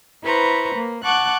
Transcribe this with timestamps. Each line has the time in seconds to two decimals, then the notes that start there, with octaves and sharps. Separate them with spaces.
0.23 E4 B4 C5 A#5 C#6
0.74 A#3
1.03 F#5 A5 C#6 D6 F#6